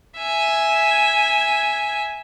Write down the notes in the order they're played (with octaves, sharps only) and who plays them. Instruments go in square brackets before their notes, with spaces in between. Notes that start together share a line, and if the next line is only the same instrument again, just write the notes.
[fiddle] E5 G#5